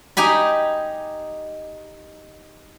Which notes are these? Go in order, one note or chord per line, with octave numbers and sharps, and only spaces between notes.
D#4 G4 G#5 B5